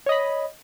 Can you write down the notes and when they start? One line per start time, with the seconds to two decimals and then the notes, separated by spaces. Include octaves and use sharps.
0.06 C#5
0.09 D#5
0.12 B5